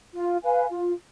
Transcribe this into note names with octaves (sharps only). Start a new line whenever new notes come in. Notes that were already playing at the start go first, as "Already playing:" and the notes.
F4
B4 F5 G#5
F4